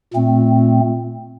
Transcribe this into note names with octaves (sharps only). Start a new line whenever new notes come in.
A#2 A3 C4